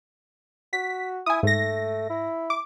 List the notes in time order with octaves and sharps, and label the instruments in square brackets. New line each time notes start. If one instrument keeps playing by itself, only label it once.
[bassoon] F#4 [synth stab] B6
[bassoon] E4 [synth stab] G#5 D#6
[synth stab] G#2 A#6 [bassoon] A3
[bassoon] E4
[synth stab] D6